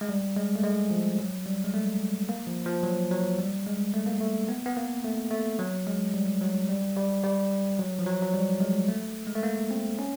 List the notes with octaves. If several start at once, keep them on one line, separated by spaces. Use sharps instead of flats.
G#3
G3
G#3
A3
G#3
F3
F#3
G3
G#3
A3
A#3
F3
F3
F#3
F#3
G3
G#3
A3
A#3
A3
B3
B3
A#3
A3
A3
F#3
G#3
G3
F#3
G3
G3
G3
F#3
F3
F#3
F#3
G3
G#3
A3
G#3
A3
A#3
C4
C#4